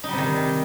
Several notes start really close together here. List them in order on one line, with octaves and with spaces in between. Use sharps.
D#4 G3 C3 D#3